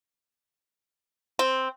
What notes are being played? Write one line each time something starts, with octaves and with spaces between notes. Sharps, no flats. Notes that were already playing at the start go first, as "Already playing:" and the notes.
C4